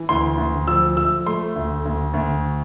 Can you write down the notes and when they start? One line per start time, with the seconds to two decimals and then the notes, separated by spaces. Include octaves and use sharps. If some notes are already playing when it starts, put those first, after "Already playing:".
Already playing: E3
0.09 D2 C6
0.38 D2
0.67 F3 E6
0.97 F3 E6
1.26 A3 C6
1.55 D2
1.86 D2
2.14 D2